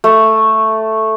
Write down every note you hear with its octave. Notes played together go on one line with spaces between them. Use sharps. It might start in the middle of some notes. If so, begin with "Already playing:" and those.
A3